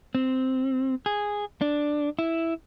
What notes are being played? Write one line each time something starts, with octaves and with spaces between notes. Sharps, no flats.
C4
G#4
D4
E4